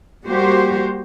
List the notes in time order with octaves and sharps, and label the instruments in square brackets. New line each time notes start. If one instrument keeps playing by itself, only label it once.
[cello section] G3 A#3 F#4 G4 C5